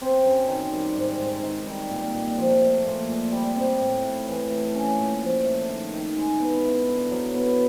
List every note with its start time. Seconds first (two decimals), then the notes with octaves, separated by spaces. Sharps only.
0.01 C4
0.24 F#2
0.48 D#3
0.72 G3
0.96 G#2
1.19 G#2
1.43 D#3
1.66 G3
1.91 A#2
2.14 A#2
2.38 F3
2.61 A3
2.86 A#2
3.09 A#2
3.32 G3
3.56 C4
3.80 A2
4.04 A2
4.27 E3
4.50 A3
4.75 C#4
4.99 A#2
5.22 F3
5.45 A3
5.69 D#3
5.93 D#3
6.16 G#3
6.40 B3
6.64 E4
6.88 D3
7.11 F#3
7.35 B3